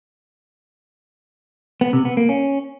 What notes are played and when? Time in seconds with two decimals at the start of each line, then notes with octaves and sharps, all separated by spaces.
1.81 B3
1.93 C3
2.05 B3
2.17 A#3
2.29 C#4